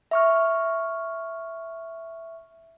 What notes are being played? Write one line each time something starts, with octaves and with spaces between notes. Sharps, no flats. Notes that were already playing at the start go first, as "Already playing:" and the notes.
E5 C#6 F6